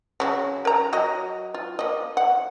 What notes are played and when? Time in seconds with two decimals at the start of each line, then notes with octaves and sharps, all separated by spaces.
0.20 C#3 F#3 F#4
0.65 A#4 A#5
0.93 F#3 F#4 D#5
1.54 F4
1.79 A#3 D#5
2.17 F#5